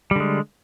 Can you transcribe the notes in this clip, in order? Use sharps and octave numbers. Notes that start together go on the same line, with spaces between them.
D3 G3 G#3